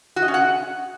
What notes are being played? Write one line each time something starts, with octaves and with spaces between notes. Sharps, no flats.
F#4
D#5
C#4
F#5